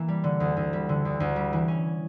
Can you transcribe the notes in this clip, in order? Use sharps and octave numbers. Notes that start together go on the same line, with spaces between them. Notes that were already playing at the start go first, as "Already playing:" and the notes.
Already playing: E3 A#3
G3
D3
D2
D2
G3
D3
D2
D2
G3
E3
C#4